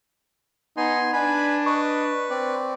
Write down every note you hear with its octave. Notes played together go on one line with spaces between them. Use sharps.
B3 D#4 G#5 C6
D4 B4 G#5 B5
B4 D#5 C#6
C4 D5